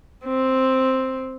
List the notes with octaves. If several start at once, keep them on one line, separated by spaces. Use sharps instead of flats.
C4